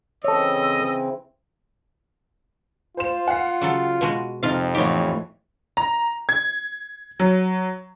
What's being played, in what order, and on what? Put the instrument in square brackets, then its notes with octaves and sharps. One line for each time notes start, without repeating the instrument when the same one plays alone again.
[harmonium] C#3 E3 C4 [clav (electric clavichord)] A4 C#5 [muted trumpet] D#5 [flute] E6
[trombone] F4 [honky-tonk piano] C5 C6 E7
[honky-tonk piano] F#5 C7
[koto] C#3 F#3 A4
B2 G#3 F#4
[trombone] F2 [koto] C3 F4 F5 [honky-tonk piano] C4 D#4
[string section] A2 E3 [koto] B3 G4 [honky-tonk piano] D#4 C#5
[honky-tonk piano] A#5
G#6
F#3